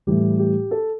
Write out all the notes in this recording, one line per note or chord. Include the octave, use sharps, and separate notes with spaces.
A2 E3 G3 G4
G4
A4